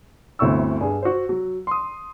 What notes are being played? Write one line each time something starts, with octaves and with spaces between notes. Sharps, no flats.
G1 D2 C4 E4 C#6 E6
G2 G#4
F#4 C5
F#3
C6 D#6